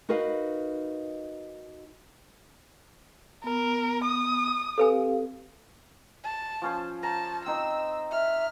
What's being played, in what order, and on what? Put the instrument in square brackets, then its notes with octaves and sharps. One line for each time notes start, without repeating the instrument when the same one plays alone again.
[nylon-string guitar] D#4 F#4 A#4 B4 D#5 F5
[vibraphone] B3 [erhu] A#4
[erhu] D#6
[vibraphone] C4 G4 F5 [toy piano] A4 B4 G#5
[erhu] A5
[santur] F3 C#4 C5
[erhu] A5 [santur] A#5
[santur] C4 D#4 C5 [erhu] E6
[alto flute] E5 [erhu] F6